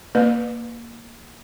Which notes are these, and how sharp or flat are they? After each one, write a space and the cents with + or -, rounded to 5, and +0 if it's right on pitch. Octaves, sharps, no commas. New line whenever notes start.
A#3 +0 B4 +0 D5 +45